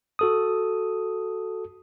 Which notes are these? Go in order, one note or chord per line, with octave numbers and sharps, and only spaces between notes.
F#4 A4 D#6